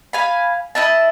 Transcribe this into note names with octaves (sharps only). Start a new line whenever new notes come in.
F5 G#5 B5
E4 D#5 A5